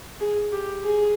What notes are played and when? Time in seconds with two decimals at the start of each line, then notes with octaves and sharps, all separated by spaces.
0.20 G#4
0.52 G4
0.85 G#4